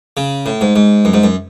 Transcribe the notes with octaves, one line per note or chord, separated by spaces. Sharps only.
C#3
A2
G#2
G#2
F#2
G#2
F#2